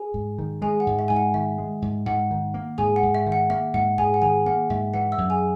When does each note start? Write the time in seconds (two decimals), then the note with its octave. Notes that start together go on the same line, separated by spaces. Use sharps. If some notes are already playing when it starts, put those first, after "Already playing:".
Already playing: G#4 G#5
0.14 G#2
0.39 D#3
0.62 G#3 G#4 G#5
0.80 F#5
0.87 G#2
0.99 E5
1.08 G#2 G#5
1.16 F#5
1.34 D#3 E5
1.58 G#3
1.82 G#2
2.06 G#2 F#5
2.31 D#3
2.54 A#3
2.78 G#2 G#4 G#5
2.96 F#5
3.03 G#2
3.15 E5
3.26 D#3
3.32 F#5
3.50 A#3 E5
3.74 G#2 F#5
3.98 G#2 G#4 G#5
4.14 F#5
4.22 D#3 G#4 G#5
4.46 A#3 F#5
4.70 G#2 E5
4.94 E3 F#5
5.12 E5 E6
5.18 F#2
5.30 G#4 G#5